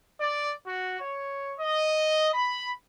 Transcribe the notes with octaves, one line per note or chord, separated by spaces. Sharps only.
D5
F#4
C#5
D#5
B5